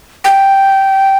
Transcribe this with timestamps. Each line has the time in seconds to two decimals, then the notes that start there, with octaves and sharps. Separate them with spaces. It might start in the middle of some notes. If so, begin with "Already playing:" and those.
0.24 G5